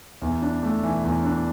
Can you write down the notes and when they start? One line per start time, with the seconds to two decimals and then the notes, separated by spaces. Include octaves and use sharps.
0.22 E2
0.42 D4
0.63 A3
0.83 E3
1.04 E2
1.25 D4